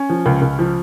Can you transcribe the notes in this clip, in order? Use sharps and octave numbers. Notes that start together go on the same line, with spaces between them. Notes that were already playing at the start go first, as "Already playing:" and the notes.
Already playing: C#4
F3
C#2
C#2
F3